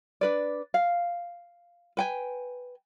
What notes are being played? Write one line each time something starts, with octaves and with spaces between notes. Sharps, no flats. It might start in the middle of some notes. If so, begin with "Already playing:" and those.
D4 B4 D5
F5
B4 G5 G#5